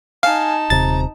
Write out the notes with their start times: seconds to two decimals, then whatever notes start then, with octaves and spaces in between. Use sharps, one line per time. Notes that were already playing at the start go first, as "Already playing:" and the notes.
0.23 D#4 F5 G#5 A5
0.70 D#1 C3 A#5 A6